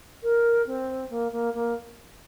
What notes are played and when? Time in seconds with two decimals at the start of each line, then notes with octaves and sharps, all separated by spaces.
0.23 A#4
0.66 C4
1.10 A#3
1.32 A#3
1.54 A#3